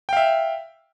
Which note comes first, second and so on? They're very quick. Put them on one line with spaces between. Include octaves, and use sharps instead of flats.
G5 F5 E5